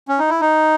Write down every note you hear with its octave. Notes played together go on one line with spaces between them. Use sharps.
C#4
D#4
E4
D#4